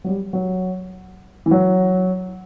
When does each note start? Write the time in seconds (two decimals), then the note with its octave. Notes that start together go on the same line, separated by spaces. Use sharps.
0.04 F#3
0.08 G3
0.33 F#3
1.46 E3
1.51 F#3